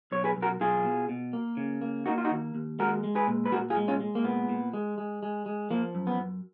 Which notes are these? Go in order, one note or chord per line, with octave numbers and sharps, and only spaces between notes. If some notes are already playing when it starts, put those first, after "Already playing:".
B1 C#5
G#4 B4
B1
F#4 A#4
B1 F4 G#4
B2
B2
A#3
C#3
A#3
A#3 D#4 F#4
F4
D#4 F#4
D#2
D#2
G#3 F#4 A#4
G#3
G#4 B4
A#2
B4
A#2 F#4 A#4
F4 G#4
G#3
C#4 F4
G#3
A#3
A#2 B3
A#2
G#3
G#3
G#3
G#3
F3 A#3
F#2
B3
F#2